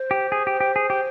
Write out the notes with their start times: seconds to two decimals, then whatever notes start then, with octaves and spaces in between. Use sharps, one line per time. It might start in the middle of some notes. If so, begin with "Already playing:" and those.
Already playing: C5
0.11 G4
0.32 G#4
0.47 G4
0.60 G4
0.76 G#4
0.90 G4